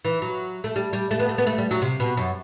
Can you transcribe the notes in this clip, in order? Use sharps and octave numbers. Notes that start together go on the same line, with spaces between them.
E3
F#3
A3
G3
G3
A3
B3
A3
B3
A3
G3
F#3
C3
B2
F#2